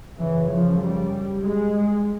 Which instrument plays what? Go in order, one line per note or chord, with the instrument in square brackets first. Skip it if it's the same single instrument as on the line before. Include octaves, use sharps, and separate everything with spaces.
[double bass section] F#2 C#3 E3
F3
G3
G#3